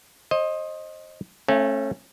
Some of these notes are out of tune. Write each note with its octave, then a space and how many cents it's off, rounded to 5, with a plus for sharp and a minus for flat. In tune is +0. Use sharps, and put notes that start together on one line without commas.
C5 +30 D#5 +0
A3 +0 C#4 -30 F5 -40